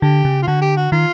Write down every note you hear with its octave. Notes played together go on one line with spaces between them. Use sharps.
D3 G4
C#3
F4
D3 F#4
G4
F#4
D#3 F4